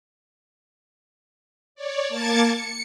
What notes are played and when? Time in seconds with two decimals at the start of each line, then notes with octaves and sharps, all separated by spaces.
1.75 C#5 D5
2.09 A#3 A5 D6 G#6 A6 C#7
2.51 C#7